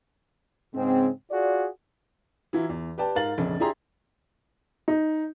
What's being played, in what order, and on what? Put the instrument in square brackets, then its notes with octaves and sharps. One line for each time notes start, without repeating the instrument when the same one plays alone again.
[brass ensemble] G#2 C#3 G#3 C4
F4 F#4 G#4 D5
[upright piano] E3 F#3 E4 F4
E2
G4 B4 D5 G5 A5
G#2 A#4 F5 A6 F#7
A#1 F2 C#3
D4 E4 G4 G#4 A#5 C6
D#4